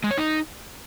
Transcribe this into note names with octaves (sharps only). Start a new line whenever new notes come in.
G#3
C#5
D#4